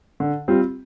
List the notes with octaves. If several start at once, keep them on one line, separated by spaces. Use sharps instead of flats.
D3
G3 C4 F4